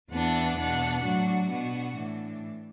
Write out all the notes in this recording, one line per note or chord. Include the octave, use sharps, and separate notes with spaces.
E2 E3 B3 D4 F#5
E2 B2 B3 D4 F#5
A2 F#3 D4 F#4
B2 B3 D4 F#4
A2 E3 D4